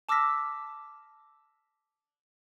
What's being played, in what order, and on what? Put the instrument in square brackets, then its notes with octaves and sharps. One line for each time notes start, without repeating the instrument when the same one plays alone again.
[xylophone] A5 D6 E6 F6 A#6 B6